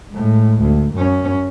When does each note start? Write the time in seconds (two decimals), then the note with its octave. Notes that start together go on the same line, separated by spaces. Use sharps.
0.11 A2 G#3
0.61 D2
0.94 F#2 C#4